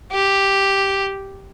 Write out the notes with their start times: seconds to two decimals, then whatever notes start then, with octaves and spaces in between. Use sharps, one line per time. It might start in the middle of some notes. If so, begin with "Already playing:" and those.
0.12 G4